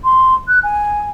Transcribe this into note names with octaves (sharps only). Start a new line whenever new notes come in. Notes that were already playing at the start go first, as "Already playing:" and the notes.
C6
F#6
G#5